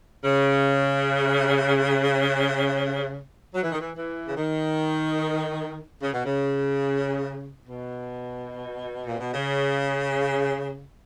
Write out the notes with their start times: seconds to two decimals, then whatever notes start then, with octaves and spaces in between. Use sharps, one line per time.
0.24 C#3
3.55 F#3
3.63 E3
3.71 D#3
3.81 E3
3.96 E3
4.26 C#3
4.37 D#3
6.03 C#3
6.13 B2
6.25 C#3
7.68 B2
9.06 A#2
9.20 B2
9.34 C#3